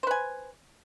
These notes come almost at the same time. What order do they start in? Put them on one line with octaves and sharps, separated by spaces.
C5 B4 G#5